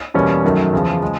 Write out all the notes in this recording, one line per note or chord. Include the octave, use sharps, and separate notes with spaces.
E2 B2 G3 A#3 C#4
F#2 D#3 F#3 A3
E2 C#3 F3
C#3 F3 G#3